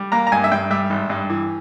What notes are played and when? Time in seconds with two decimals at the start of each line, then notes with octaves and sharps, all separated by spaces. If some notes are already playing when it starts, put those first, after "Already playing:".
Already playing: G3
0.12 A#3 A#5
0.27 A#5
0.32 G2 G#5
0.44 E5
0.51 G2 G5
0.70 G3 E5
0.90 G#1
1.10 G2
1.30 E3